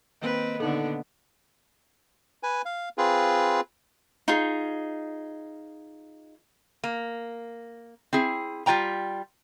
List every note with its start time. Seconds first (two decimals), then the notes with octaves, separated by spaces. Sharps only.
0.21 D#3 A#3 C4 B4
0.60 A#2 D3 B3 D#4 A4
2.43 B4 G#5
2.65 F5
2.98 C4 F4 G#4 B4
4.28 D#4 F4 G#4
6.84 A#3
8.13 C4 E4 G#4
8.66 G3 F4 C#5 G5 A#5